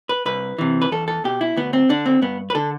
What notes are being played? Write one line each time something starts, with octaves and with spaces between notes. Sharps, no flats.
B4
C2 B4
C3 E3
B4
E2 A4
A4
B2 G4
E4
D2 B3
C4
D3 D4
C4
G2 B3
B4
D3 A4